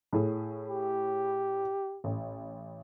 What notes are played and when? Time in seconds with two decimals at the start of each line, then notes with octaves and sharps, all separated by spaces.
0.13 A2 E4 G#4
0.68 G4
2.04 A1